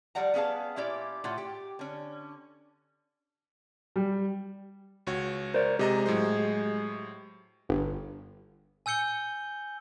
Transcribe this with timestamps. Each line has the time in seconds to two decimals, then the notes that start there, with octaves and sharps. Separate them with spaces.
0.15 F3 G3 D5 F#5 A#5
0.34 B3 C#4 G#4 F5 A5
0.76 A#2 C#4 E4 G4 D5
1.24 A2 F4 F#5
1.38 G4
1.79 D3 C#4
3.96 G3
5.07 C#2 F#4 C#5
5.54 A#4 C5 D5
5.79 C3 G#3 G4 D#5 A#5
6.06 A2 F#3 C5
7.69 G1
8.86 G#5 E6 G6 C#7 G7